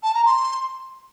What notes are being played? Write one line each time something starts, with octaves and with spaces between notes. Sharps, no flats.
A5
A#5
C6